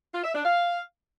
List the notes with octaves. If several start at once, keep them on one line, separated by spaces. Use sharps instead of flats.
F4
E5
D4
F5